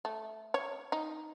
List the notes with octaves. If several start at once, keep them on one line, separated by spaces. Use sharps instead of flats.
A3
C#5
D#4